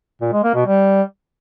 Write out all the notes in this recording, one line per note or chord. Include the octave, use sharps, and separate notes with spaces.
A#2
G#3
A#3
B2
G3